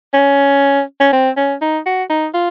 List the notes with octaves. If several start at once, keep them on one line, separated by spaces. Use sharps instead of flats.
C#4
C#4
C4
C#4
D#4
F#4
D#4
F4